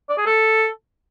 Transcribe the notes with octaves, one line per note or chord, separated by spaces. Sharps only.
D5
G#4
A4